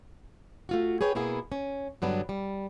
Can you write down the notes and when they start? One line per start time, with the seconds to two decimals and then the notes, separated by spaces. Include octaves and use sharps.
0.69 A3 F4 F#4
1.01 G#4 B4 C#5 G5
1.15 B2 A#3 B3 E4 G#4
1.52 C#4
2.02 G2 D3 F#3 B3 D4
2.29 G3